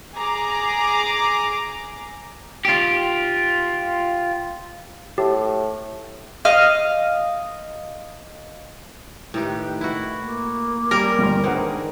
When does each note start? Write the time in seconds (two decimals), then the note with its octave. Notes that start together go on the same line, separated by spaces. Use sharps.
0.15 G#4 A#5 D6
2.65 F4 G4
5.18 A2 G4
6.45 D#5 F5
9.34 A2 D#3 G4 B4
9.81 E4 F#4
10.21 A#3
10.91 G3 C#4 A#4 D6
11.19 G1 G5 C6
11.44 G#2 D#3 D4 G#4 B4 C5 F#5